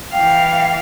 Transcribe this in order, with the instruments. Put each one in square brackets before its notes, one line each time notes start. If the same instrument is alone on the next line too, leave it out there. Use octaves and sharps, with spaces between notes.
[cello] E3 F5 [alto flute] G5